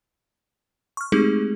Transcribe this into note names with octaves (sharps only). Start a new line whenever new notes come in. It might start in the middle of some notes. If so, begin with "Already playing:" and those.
C#6 F6
G#3 A3 C4 D#4 G4 G#4